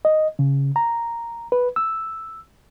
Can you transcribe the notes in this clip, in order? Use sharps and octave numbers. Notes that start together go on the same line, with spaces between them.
D#5
C#3
A#5
B4
E6